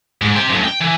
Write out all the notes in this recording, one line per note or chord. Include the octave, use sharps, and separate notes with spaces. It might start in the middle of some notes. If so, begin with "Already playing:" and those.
G#2
G4 C5
F#2 A2
G5
E3